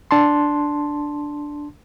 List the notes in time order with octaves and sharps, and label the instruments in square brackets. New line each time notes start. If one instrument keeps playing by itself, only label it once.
[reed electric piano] D4 A5 C6